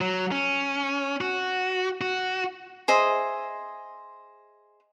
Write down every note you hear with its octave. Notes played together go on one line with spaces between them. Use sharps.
F#3
C#4
F#4
F#4
G#4 C5 D#5 E5